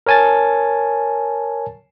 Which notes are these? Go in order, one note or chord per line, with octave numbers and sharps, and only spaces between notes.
A#4 C#5 G#5 A5 A6